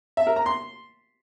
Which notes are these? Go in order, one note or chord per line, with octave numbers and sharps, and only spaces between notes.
E5
A#4
A#5
C6